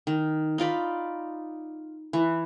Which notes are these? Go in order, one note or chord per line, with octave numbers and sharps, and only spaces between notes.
D#3
D#4 F4 D5 B5
E3